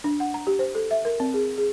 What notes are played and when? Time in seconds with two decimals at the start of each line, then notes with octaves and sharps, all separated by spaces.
0.04 D4
0.20 F#5
0.34 A#5
0.47 G4
0.59 C5
0.75 A4
0.91 E5
1.05 A#4
1.20 C4
1.34 G#4
1.58 G#4